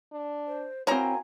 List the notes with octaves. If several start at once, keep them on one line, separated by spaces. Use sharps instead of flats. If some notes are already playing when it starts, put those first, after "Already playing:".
D4
C5
A#3 C4 E4 F#4 A#4 C#5 G#5 A#5